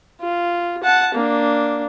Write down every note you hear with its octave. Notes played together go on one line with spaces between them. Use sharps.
F4
F#5 A5
A#3 D4